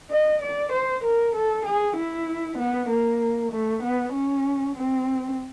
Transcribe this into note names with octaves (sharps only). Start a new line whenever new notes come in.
D#5
D5
C5
A#4
A4
G#4
E4
B3
A#3
A3
B3
C#4
C4